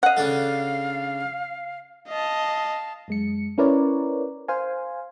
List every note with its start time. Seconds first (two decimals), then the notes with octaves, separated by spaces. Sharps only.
0.03 D#5 F5 F#5
0.17 C#3 D4 A4
2.09 D#5 F5 A5
3.08 F#2 G#3 C#7
3.58 C#4 E4 A#4 B4 C#5 D5
4.48 C5 F5 G#5